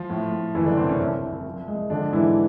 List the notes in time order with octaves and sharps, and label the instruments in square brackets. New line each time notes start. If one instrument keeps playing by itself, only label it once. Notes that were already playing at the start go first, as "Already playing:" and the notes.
Already playing: [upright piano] F3 F4
A2
A2
F#1 E3 E4
D3 D4
C3 C4
C#4
C2
C2
F3
G#3
D3 F3 D4
G#2 E3 E4